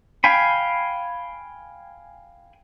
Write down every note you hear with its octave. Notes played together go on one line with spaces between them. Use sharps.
F5 G5 G#5 B5